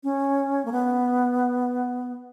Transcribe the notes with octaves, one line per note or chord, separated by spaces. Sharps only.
C#4
A#3
B3